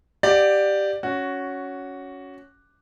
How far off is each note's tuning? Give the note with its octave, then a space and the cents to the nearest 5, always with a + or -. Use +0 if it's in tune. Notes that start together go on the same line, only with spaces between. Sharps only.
G4 +0 D5 +15 F#5 -25
C#4 +10 F#4 +0